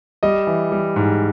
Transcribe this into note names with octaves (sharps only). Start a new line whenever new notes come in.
G3 D#5
E3
G3
G#2